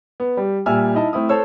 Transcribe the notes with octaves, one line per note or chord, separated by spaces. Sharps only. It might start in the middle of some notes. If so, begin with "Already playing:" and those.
B3
G3 G4
A#2 G3 E5 G#5 E6 F6
D#4 E4 D#5 A5
A3 C4 E4 D#6
A4 C5 C#5 E6